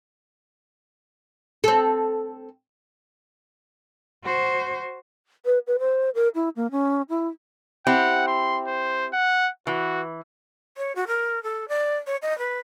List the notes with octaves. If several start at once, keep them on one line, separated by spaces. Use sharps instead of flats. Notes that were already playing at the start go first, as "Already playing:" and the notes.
C4 A4
F#4 C5
B4
B4
C5
A#4
E4
A#3
C#4
E4
C4 E4 G4 F#5
C6
C5
F#5
E3 F#4
C#5
F#4
A#4
A4
D5
C#5
D#5
B4